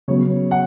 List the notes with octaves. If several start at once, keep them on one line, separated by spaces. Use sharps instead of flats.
C#3 F#3 B3 C#5
F#5